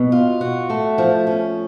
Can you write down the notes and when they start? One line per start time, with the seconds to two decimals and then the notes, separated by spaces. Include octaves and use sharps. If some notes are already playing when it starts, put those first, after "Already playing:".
Already playing: B2
0.12 F4
0.41 F#4
0.70 A3
0.98 F3
1.27 C#4